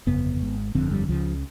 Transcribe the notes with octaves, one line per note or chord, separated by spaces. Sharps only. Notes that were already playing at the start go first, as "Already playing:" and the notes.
G1 F2 C#3 B3
G#1 G#2
G1 F2 D3 C4
G3
C#2 C#3 F3